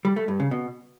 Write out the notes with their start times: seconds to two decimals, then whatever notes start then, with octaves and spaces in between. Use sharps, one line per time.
0.05 G3
0.16 A3
0.28 G2
0.40 C#3
0.51 B2